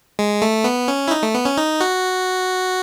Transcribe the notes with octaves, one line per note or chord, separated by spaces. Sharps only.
G#3
A3
B3
C#4
E4
D#4
A3
B3
C#4
D#4
F#4